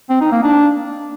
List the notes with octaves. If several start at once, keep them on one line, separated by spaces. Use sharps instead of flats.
C4
D#4
A#3
D4